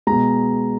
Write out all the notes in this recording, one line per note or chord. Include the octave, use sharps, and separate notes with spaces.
B2 G#3 A#5